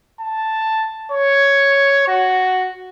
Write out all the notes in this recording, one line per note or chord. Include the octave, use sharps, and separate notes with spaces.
A5
C#5
F#4